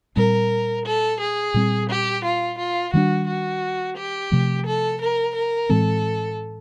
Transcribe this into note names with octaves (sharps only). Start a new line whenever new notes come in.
A#2 G3 C4 A#4
A4
G#4
A#2 G3 C4
G4
F4
F4
D#3 G3 B3 D4 F#4
F#4
G4
C3 F3 A3
A4
A#4
A#4
A2 E3 G#3 C4 A4